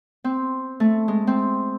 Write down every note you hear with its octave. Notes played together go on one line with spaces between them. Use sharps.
C4
A3
G#3
C4